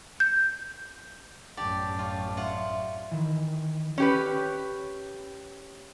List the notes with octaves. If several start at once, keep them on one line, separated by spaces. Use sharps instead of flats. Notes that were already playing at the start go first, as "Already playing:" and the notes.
G6
A1 F#2 G4 D5 A5
G3 F4
F4 E5 F#5 C6
D#3 E3
C#4 G4 B4